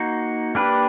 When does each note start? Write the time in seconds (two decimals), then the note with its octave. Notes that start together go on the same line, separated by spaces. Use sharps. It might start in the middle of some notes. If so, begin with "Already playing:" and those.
Already playing: A#3 D#4 F#4
0.55 A#3 D4 G4 B4